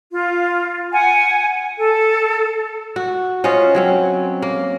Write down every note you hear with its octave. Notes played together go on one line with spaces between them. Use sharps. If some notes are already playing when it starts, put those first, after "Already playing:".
F4
F#5 G#5
A4
F#4
C#4 F4 C5 D#5
F#3 C4 C#4
A#3